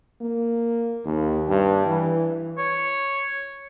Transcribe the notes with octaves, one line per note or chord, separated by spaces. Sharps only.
A#3
D#2
G2
E3
C#5